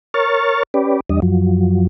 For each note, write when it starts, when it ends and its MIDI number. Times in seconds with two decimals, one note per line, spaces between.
0.14 0.63 70
0.14 0.63 73
0.14 0.63 85
0.14 0.63 89
0.14 0.63 93
0.74 1.00 61
0.74 1.00 67
0.74 1.00 71
0.74 1.00 74
1.10 1.20 40
1.10 1.20 55
1.10 1.20 62
1.10 1.20 75
1.22 1.87 42
1.22 1.87 53
1.22 1.87 54